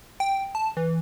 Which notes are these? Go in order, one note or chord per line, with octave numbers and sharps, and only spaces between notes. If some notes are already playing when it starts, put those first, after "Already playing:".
G5
A5
E3